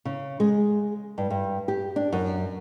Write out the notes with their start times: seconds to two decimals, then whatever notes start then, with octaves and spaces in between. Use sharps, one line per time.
0.05 C#3
0.40 G#3
1.18 G2
1.30 G2
1.68 G4
1.96 D4
2.12 F#2